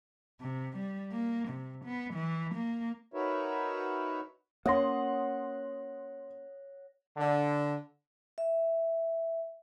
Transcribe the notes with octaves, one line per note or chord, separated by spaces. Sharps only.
C3
G3
A#3
C3
B3
E3
A#3
D#4 F#4 A#4 B4 C#5 E5
A#3 C#4 C#5 F#5 C6 D#6 A#6
D3
E5